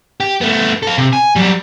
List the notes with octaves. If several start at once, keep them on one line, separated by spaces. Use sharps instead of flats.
G4
A3 B3
A4 F5
C3
G#5
F#3 G3